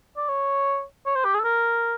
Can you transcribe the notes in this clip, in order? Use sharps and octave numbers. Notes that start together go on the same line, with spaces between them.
D5
C#5
C#5
C5
G4
G#4
A4
A#4